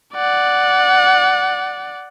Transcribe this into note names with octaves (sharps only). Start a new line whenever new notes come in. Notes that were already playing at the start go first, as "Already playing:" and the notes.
D5 F#5